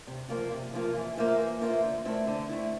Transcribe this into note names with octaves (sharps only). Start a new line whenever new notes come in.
C3
F3 A#3 F4
C3
F3 A#3 F4
E3
A#3 F4 C5 E5
E3
A#3 F4 C5 E5
D3
A3 C4 E4
D3
A3 C4 E4